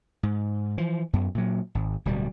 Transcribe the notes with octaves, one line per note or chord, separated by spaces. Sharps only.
G#2
E3 F3
F#2 B3
A#2 F#3
G#1
D1 B2 G3